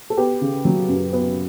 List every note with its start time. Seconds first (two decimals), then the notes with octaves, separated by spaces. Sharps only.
0.10 A4
0.17 B3 G4
0.41 C#3
0.65 F#3
0.89 F#2
1.13 B3